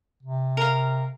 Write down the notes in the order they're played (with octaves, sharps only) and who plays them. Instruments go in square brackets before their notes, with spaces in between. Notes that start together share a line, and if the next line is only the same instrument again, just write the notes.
[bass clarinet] C3
[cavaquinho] A#4 F5